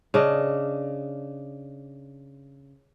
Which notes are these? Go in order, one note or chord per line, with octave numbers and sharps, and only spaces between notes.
C#3 D4 D#5